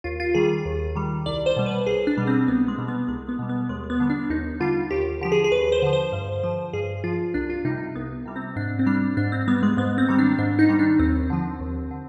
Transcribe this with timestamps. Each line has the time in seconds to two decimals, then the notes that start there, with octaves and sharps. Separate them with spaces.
0.04 D#2 F4
0.20 F4
0.34 D#3 G3 G#4
0.65 D#2
0.96 D#3 G3
1.26 C2 D5
1.46 C5
1.56 B2 G3
1.66 B4
1.86 C2 G#4
2.07 D4
2.17 B2 G3
2.27 C4
2.48 C2 B3
2.68 G#3
2.78 B2 G3
2.88 B3
3.08 C2 G#3
3.29 B3
3.39 B2 G3
3.49 B3
3.69 D#2 G#3
3.84 G#3
3.90 B3
4.00 D3 G3
4.10 D4
4.30 D#2 D#4
4.60 D3 G3 F4
4.91 D#2 G4
5.21 D3 F3 G4
5.32 G#4
5.44 G#4
5.52 D#2 B4
5.72 C5
5.82 D3 F3
5.93 C5
6.13 G2
6.44 F3
6.73 G2 G#4
7.04 F3 F4
7.34 C2 D4
7.50 F4
7.65 C3 G3 D#4
7.95 C2 B3
8.25 C3 G3
8.36 C4
8.56 G#2 D4
8.79 C4
8.86 G3 D4
9.17 G#2 D4
9.32 C4
9.48 G3 B3
9.63 G#3
9.77 G#2 B3
9.98 C4
10.08 D#3 G3
10.18 D4
10.39 G#2 D4
10.59 D#4
10.69 D#3 G3
10.79 D4
10.99 D#2 C4
11.30 D3 F3
11.60 D#2
11.91 D3